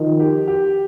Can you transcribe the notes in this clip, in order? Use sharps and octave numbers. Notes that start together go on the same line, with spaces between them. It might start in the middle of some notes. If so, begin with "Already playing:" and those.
Already playing: D#3 F3
G4
G4